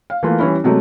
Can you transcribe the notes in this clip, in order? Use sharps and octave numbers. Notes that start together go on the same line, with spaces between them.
F5
E3 A3 A#3 F4
E3 G3 C#4 E4
C3 F#3 G#3 A3